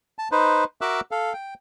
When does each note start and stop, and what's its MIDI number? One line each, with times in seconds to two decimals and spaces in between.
0.19 0.28 81
0.32 0.64 63
0.32 0.64 71
0.32 0.64 72
0.81 1.00 66
0.81 1.00 70
0.81 1.00 76
0.81 1.00 86
0.81 1.00 88
0.81 1.00 90
1.11 1.33 69
1.11 1.33 77
1.33 1.54 79